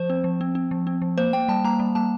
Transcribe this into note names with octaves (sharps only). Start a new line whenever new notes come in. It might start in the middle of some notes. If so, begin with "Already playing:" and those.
Already playing: F3 C5
C4
F3
C4
C4
F3
C4
F3
A#3 C5
A#3 G5
G3 A5
A#3 A#5
G3
A#3 A5